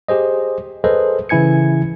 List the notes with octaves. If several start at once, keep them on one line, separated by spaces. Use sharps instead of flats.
G4 G#4 C5 D#5
G#4 A4 B4 C5 D#5
C#3 E3 E4 G#5 G#6 C#7